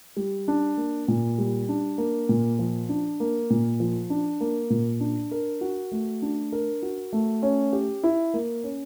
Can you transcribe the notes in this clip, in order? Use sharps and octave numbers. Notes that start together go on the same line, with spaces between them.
G3
D4
A#3
A#2
G3
D4
A#3
A#2
F3
D4
A#3
A#2
F3
D4
A#3
A#2
D4
A#4
F#4
A3
D4
A#4
F#4
A3
C#4
G4
E4
A#3
C#4